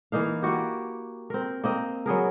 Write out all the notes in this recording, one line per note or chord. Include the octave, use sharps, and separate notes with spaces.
E3 A#3 D#4 F5
A#3 E4 F#4 G4
C4 A#4
A#3 C4 D#5
F#3 B3 G#4 A#4